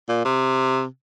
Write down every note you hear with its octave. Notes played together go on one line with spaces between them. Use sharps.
A#2
C3